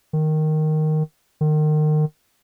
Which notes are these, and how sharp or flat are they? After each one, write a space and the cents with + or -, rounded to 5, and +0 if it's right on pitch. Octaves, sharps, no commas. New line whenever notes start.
D#3 -5
D#3 -30